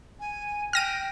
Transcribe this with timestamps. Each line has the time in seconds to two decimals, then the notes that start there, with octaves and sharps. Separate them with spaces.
0.20 G#5
0.73 G5 F6 A#6 D#7